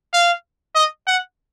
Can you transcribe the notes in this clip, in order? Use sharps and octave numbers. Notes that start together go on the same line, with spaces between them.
F5
D#5
F#5